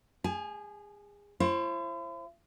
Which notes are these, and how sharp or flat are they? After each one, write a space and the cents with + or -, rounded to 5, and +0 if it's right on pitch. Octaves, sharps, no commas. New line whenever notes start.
G#4 -30 G#5 +35
E4 +45 C5 +30